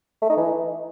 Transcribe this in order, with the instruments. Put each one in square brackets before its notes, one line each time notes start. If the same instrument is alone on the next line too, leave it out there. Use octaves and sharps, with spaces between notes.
[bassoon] A3
D#4
E3